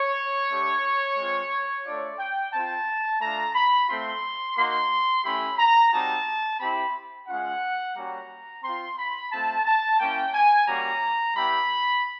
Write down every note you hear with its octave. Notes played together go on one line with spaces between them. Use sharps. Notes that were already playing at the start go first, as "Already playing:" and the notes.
Already playing: C#5
A3 D4 G4
G#3 C4 F4
A3 D4 F4 D5
G5
C4 F4 A5
A3 D4 F4 A#5
B5
A3 C4 F4 C6
A#3 D#4 F#4 C6
A3 C#4 E4 G4 B5
A#5
G3 C4 D#4 F#4 A5
C4 E4 G4 B5
G#3 C#4 F4 F#5
G3 A#3 C#4 F#4 A#5
C4 F4 C6
B5
A3 C4 F4 A5
A5
A#3 C#4 E4 G5
G#5
G3 A#3 C#4 F#4 A#5
G3 B3 E4 G4 B5